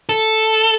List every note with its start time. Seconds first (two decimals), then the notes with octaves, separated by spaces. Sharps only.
0.09 A4